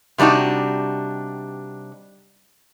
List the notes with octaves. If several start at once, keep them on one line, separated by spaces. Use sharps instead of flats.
C3 G3 D4 D#4 F#4